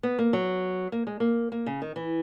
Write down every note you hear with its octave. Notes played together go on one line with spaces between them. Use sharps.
B3
A#3
F#3
A#3
G#3
A#3
A#3
C#3
D#3
E3